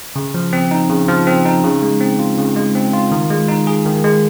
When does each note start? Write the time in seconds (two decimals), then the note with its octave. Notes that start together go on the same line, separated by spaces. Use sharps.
0.16 C#3
0.34 F3
0.53 C4
0.71 D#4
0.90 C#3
1.08 F3
1.27 C4
1.45 D#4
1.63 C#3
1.82 G#3
2.01 C4
2.19 F4
2.38 C#3
2.56 G#3
2.75 C4
2.93 F4
3.12 D#3
3.30 G#3
3.48 D#4
3.67 G#4
3.86 D#3
4.04 G#3